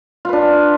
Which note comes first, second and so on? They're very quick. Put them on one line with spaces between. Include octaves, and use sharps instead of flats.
F4 B4 D4